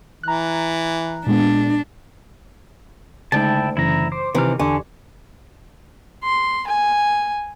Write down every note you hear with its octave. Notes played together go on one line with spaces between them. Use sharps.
E3 A#5 F#6
A#2 G#3 B3 D4
D2 C#3 G#3 D#4 E4 G5 A5
F#2 C#3 E3 E4 A#5
C5 D6
C3 D#3 E3 F6
E2 D3 G#5 C#6
C6
G#5